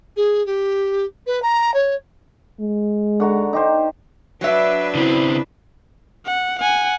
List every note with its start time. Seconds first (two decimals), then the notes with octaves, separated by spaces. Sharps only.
0.16 G#4
0.46 G4
1.26 B4
1.42 A#5
1.74 C#5
2.60 G#3
3.20 D3 F#4 A#5
3.53 D#4 G4 C5
4.41 F#3 D4 B4 E5
4.95 C#3 C4 E4
6.26 F#5
6.59 F#5 G#5